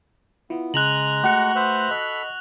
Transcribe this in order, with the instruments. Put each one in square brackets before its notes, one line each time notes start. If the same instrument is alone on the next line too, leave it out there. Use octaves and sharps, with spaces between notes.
[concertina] B3 [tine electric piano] E4 F4
[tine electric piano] C#3 [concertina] G#3 A#5 [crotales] F#6 F7 F#7
[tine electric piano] A3 C#7 [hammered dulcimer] F#4
[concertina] B4 C5 E5
[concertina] A4 B5 [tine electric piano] D#5